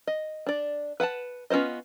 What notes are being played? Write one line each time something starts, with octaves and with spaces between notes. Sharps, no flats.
D#5
D4 D5
B4 F#5 G#5 A5
B3 C#4 F4 C5 D#5